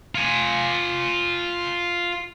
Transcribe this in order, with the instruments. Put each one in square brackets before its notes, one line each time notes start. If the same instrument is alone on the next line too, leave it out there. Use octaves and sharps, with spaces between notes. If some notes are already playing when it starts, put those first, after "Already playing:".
[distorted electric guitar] F4 G#5